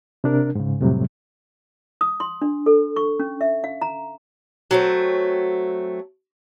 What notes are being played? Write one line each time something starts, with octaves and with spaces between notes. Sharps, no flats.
C3 D4 A#4
G#2 C#3
F2 A2 C3 F#3 G3
D#6
C6
D4
A4
C#6
C#4
E5
F5
A#5
F#3 A3 C4